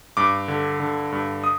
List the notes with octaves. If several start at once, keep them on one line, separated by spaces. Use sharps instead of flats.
G2 D6
D3
D3
G2
D#6